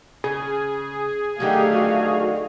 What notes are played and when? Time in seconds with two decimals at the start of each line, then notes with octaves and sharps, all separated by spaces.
0.24 C#3 G#4
1.40 D3 D#3 F#3 A3 G4 F5
1.72 F#4